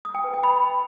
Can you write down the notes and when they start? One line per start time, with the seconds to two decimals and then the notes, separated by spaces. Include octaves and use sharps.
0.05 D#6
0.15 G5
0.24 B4
0.34 G5
0.43 B5